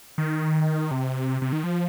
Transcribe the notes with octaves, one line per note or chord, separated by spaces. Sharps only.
D#3
C3
C3
D#3
F3